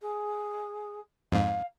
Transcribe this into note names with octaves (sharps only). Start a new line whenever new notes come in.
G#4
F2 G#2 F5